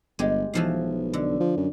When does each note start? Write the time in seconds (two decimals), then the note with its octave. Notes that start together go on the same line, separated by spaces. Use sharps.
0.19 G1 G#3 G4
0.54 B1 E3 F3 F5
1.13 D3
1.40 F3
1.57 F#2